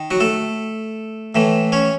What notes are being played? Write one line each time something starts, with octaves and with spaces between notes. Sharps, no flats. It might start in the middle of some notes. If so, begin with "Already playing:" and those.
Already playing: D#3
F#3 F#4
A3 A4
A2 E3 A3
C#4 C#5